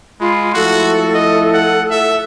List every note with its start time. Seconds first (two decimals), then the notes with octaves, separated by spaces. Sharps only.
0.20 G#3 F4 B5
0.54 F3 A3 E4 F#4 A4
1.14 D#5
1.54 F#5
1.90 E5